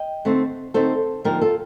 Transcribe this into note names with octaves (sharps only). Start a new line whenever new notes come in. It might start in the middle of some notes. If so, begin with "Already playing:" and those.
Already playing: D#5 G5
D3 A3 C4 D#4
D3 A3 C4 D#4 A4 C5
D3 F3 A#3 D#4 G4 A#4
F4 A4